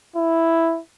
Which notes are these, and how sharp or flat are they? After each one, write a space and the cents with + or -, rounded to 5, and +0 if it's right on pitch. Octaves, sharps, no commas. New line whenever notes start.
E4 +0